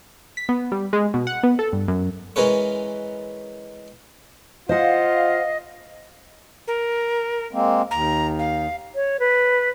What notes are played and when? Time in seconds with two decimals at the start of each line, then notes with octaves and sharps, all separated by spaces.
0.37 B6
0.49 B3
0.72 G3
0.93 G#3
1.14 B2
1.27 F#5
1.43 B3
1.59 A4
1.73 G2
1.88 F#2
2.36 E3 G#3 C#4 A#4 B4 C#5
4.69 F4 C5 D#5 F5 F#5
6.68 A#4
7.53 G#3 A#3 C4
7.91 D#2 A#5
8.39 F5
8.95 C#5
9.20 B4